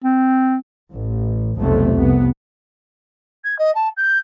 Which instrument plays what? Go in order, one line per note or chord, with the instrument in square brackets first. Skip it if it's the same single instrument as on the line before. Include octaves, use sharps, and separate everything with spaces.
[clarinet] C4
[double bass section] A1
F1 B1 F2 C3 A3
C2 B3
[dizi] G#6
D#5
A5
G6